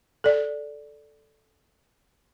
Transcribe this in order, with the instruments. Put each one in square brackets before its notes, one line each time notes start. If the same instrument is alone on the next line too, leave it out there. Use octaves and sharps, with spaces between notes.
[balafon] A4 D5